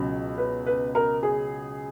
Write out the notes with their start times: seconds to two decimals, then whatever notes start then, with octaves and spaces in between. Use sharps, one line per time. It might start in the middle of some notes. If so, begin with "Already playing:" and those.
Already playing: C#2 B2 F#3
0.38 B4
0.66 B4
0.95 A#4
1.23 G#4